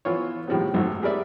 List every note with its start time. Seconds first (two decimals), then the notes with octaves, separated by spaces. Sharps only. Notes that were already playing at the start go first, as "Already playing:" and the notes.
0.05 E3 B3 F4 C#5
0.48 A2 D#3 F3 G3 G#3 B3
0.74 G#1 F#2 A3 F#4
1.02 G4 G#4 A#4 B4 D5 E5